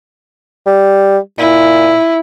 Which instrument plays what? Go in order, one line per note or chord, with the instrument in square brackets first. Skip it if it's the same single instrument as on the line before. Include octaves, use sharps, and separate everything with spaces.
[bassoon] G3
[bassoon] A#2 [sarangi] E4